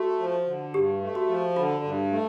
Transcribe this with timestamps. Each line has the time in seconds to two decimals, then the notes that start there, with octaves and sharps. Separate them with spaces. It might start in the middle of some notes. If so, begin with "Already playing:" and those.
Already playing: A3 F#4
0.20 F3
0.46 D3
0.74 G2 G4
1.02 A3
1.15 F#4
1.29 F3
1.56 D3 F4
1.84 G2
2.11 A3